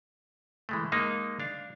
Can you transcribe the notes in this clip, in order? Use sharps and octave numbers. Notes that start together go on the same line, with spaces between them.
E3 G#3 A3
G#3 A#3 D#4
D4 F5